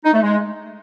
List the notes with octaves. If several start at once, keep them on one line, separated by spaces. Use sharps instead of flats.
D#4
A3
G#3